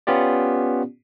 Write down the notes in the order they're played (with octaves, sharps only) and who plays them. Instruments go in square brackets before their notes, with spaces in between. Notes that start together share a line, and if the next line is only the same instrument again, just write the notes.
[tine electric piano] B3 C#4 F4 G4 D5